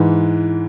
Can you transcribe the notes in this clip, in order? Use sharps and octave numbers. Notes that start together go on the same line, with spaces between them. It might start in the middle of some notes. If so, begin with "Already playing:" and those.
Already playing: G#2 E3